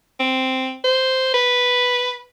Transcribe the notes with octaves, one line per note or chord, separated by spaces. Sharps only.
C4
C5
B4